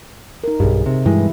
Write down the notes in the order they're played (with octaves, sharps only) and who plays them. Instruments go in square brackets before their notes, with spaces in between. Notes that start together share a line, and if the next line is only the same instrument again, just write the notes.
[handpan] D#4 A#4
[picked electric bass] B1 G2 [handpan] G4 G#4
[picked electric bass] C3
[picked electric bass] G2 G#3 [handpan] B2 E3 E4